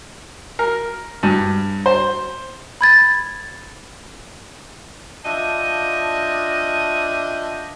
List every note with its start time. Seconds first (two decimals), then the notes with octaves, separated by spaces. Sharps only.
0.59 A#4
1.23 G2
1.86 C5
2.81 B5 G#6 A6
5.25 D4 F4 D#5 E5 G5 A5